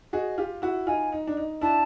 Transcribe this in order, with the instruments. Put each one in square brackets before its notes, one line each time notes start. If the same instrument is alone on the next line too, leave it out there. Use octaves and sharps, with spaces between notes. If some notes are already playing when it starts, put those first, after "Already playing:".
[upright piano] F#4 G#4 [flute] D#5
[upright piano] F4 G4
E4 F#4
[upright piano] D#4 F4 [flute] G#5
[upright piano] D#4
D4
D#4
[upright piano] D4 E4 [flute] A5